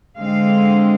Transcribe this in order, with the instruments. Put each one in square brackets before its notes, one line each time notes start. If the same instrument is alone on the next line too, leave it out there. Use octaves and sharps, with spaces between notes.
[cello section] D3 G#3 C4 F5